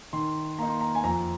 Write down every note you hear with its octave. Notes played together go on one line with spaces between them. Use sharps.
D#3 C6
A#3 D#4 A#5
C6
A#5
G#5
F2 A#5